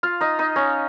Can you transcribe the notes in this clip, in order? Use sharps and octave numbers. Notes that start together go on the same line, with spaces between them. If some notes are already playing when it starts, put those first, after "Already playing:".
F4 F5
D#4 D#5
D#4 D#5
C#4 C#5